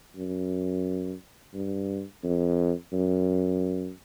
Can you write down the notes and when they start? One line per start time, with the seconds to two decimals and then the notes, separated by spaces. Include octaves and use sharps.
0.16 F#2
1.54 G2
2.24 F2
2.93 F#2